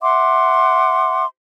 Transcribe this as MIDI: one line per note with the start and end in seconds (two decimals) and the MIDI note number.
0.02 1.24 76
0.02 1.24 78
0.02 1.24 84
0.02 1.24 86